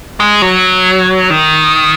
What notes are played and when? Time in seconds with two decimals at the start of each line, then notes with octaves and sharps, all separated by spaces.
0.20 G#3
0.42 F#3
1.30 D#3